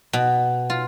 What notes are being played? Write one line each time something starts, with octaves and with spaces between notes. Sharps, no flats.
B2
F4